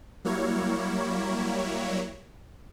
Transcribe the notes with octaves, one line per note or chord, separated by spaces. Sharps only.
F#3 G3 A#3 E4 C#5